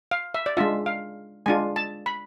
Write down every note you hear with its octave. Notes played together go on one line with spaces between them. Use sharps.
F5
E5
D5
G#3 D4 F4 E5
F5
G#3 D4 F4 G#5
A5
B5